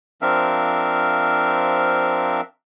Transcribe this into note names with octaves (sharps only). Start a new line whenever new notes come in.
F3 C4 D4 A#4 E5 F5